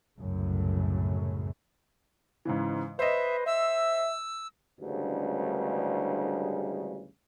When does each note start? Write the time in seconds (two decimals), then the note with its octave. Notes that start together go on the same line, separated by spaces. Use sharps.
0.19 C2 F#2 A2 C#3
2.45 G#2 C#3 E3
2.99 B4 C5 D#5 E5
3.46 E5 E6
4.80 A1 D2 G2 C#3 G3 G#3